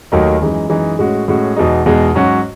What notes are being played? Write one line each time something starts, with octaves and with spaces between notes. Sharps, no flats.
D#2 D#3 F#3 A3 D#4
F#2 E3 G#3 D#4
F#2 E3 G#3 D#4
A2 G#3 C#4 F#4
A2 G#3 C#4 F#4
E2 B2 G#3 D#4
E2 B2 G#3 D#4
G#2 F#3 C#4 F#4